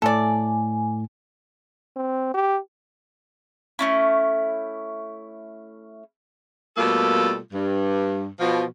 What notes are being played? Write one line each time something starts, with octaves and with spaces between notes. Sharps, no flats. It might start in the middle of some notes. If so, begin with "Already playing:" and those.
A2 A3 A4 D5 G#5
C4
G4
A3 C#4 E4
B2 G3 A3 A#3 F4 A4
G2
B2 F3